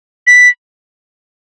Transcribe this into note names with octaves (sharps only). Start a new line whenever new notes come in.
B6